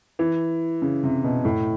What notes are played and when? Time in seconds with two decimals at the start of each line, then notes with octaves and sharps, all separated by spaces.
0.19 E3
0.82 C#3
1.03 C3
1.24 B2
1.45 A2